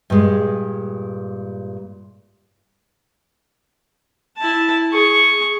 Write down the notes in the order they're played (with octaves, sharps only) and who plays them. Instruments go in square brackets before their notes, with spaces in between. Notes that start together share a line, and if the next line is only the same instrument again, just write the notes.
[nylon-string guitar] G2 A#2 G#3
[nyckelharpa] E4 A5
G#4 C#6